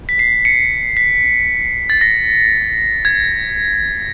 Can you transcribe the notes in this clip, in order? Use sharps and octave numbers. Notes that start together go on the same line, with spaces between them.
B6
C7
C#7
B6
A6
A#6
G#6